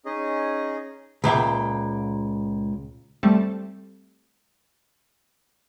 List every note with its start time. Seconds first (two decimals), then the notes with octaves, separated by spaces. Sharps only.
0.05 C#4 D#4 G#4 D#5
1.24 C#2 A#2 E5 G5
3.23 G3 A3 C4 A4